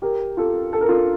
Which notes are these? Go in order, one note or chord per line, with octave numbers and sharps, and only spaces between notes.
G4 A#4
F4 A4
A4
A#4
F4 A4